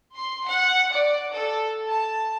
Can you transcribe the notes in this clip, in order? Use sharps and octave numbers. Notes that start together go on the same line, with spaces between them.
C6
F#5
D5
A4
A5